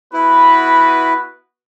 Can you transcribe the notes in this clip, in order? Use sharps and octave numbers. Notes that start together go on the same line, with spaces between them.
B3 E4 F#4 B4